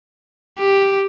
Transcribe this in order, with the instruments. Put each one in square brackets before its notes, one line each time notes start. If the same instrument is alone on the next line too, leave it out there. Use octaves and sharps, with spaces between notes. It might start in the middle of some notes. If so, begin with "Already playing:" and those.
[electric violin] G4